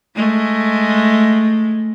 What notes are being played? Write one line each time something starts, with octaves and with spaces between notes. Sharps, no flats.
G#3 A3